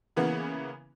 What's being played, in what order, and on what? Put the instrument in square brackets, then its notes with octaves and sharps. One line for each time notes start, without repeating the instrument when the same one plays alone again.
[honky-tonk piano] C#3 E3 A#3 B3